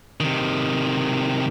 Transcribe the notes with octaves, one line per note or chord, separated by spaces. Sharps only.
C3 D#3